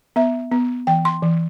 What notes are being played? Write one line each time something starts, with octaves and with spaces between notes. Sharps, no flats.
B3 E5
B3
E3 G5
C6
E3